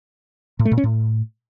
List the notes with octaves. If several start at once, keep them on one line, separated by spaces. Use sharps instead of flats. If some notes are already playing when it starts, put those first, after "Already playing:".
A2
A3
A#2
C#4
A2